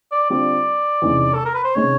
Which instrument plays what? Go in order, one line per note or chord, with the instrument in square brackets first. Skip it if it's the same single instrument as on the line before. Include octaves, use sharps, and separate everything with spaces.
[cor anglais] D5
[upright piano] D3 G3 C4 F4 [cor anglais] D5
[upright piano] E2 C3 D#3 G#3 C#4
[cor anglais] A4
A#4
B4
C5
[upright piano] C3 D#3 G#3 C#4 [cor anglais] C#5